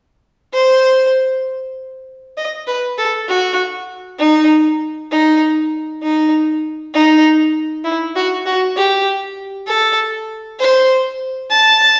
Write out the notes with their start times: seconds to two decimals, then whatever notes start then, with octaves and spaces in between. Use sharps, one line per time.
0.53 C5
2.37 D#5
2.67 B4
2.98 A4
3.28 F#4
4.19 D#4
5.11 D#4
6.03 D#4
6.94 D#4
7.84 E4
8.15 F#4
8.46 F#4
8.77 G4
9.67 A4
10.59 C5
11.51 A5